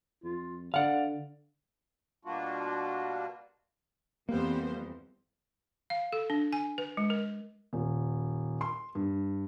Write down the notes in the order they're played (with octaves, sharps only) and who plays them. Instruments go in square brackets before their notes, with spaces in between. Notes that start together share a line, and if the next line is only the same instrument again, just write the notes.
[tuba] F2 [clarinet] F4
[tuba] D3 [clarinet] D5 [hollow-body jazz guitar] F5 F#5
[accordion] B2 G3 A#3 D4 F4 F#4
[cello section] F2 E3 [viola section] G3 B3 C5 [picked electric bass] A#3
[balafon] F5
A4
D4
G#5
B4
G#3
A#4
[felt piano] D#1
C6
G2